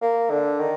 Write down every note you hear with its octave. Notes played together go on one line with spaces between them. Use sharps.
A#3
D3
D#3